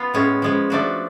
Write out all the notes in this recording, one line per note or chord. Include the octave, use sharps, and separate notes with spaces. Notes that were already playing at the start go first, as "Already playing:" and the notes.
Already playing: B3 F4
A2 G#3 C#4
F3 G#3 C#4
F3 A3 D4 F#4